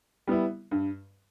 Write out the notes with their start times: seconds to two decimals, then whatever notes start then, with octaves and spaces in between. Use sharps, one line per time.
0.27 G3 B3 E4
0.71 G2